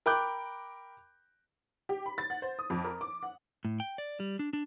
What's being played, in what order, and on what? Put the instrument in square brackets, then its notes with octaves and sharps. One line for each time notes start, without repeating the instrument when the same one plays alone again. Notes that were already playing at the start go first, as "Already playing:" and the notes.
[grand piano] A#4 G5 B5 D6 F#6 G6
[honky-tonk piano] G4
B5
A6
F#5
C5
D#6
F2
A#4
D6
F#5
[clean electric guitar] A2
G5
D5
G3
D4
D4